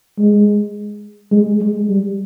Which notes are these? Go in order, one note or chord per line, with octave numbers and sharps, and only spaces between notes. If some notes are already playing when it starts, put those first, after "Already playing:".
G#3
G#3
G#3
G3